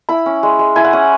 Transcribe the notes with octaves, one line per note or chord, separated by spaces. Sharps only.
E4 B5
C#4
G#3
G#3
E4 G#5
F#5
C#4 G#5